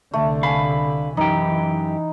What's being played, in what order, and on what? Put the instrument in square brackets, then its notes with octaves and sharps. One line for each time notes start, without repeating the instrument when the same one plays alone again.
[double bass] C2 D3 [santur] A3
[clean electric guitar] F5 [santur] G#5 B5
[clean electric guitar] F#2 G4 [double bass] E3 [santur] D#4